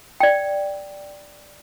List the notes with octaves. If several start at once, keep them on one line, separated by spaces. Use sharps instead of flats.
D5 G5